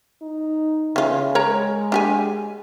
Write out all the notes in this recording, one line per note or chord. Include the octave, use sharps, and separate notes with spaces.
D#4
C#3 E3 F4
G#3 A#4 C#5 A#5
D4 G4 G#5